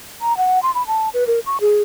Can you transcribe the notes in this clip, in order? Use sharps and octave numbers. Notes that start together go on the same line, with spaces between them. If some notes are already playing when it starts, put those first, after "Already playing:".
A#5
F#5
C6
B5
A5
B4
A#4
C#6
G#4